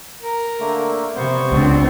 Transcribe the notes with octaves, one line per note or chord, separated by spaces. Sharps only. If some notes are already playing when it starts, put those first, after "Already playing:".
A#4
D3 A3 A#3
C3 B3 C5 C#6
C#2 C4 D4